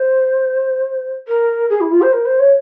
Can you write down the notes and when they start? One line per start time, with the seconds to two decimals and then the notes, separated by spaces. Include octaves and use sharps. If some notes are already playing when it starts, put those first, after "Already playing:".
Already playing: C5
1.27 A#4
1.69 G#4
1.80 E4
1.91 F4
2.01 C5
2.12 A#4
2.25 C5
2.39 C#5